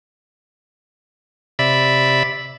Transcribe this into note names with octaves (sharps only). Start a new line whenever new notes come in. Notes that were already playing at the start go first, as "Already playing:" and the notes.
C3 D5 E5 B5